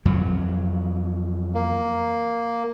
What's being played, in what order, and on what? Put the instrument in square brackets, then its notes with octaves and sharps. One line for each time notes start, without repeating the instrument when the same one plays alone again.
[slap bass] F2 E3 F#3
[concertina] A#3